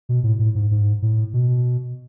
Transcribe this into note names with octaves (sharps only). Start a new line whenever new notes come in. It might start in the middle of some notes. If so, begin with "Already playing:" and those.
B2
A2
A2
G#2
G#2
A2
B2